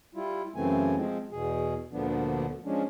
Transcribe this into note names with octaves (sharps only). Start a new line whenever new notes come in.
G3 E4 F4
F#2 C#3 E3 A3 C4 G#5
F3 G#3 C4
E2 B2 G#4
D2 A#2 D3 F3 B3 D4
F3 G#3 C#4 D4